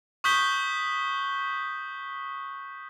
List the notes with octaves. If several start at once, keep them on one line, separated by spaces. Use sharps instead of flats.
C#6 D#6 F#6 G6 B6 G7